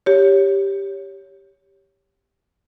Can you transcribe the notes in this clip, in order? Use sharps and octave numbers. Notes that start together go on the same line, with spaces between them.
G4 C#5